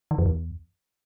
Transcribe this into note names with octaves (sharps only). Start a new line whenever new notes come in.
D#3
F2
E2